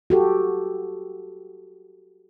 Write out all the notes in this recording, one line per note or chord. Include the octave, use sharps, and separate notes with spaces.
F#4 G4 A4